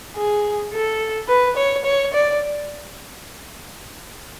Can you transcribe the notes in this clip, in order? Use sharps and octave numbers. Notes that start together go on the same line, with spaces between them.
G#4
A4
B4
C#5
C#5
D5